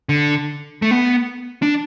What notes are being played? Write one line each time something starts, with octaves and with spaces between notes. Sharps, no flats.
D3
A3
B3
D4